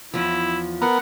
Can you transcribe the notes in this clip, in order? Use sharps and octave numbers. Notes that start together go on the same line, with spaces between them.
E2 F3 E4
B3 A#4 F#5